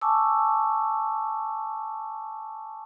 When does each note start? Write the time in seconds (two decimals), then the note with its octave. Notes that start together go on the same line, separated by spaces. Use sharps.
0.01 G#5 A5 C#6 D6 E6